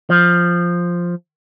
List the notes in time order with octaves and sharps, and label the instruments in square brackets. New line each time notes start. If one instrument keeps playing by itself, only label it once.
[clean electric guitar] F3